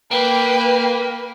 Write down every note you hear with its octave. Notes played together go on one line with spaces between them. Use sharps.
A#3 B4 G5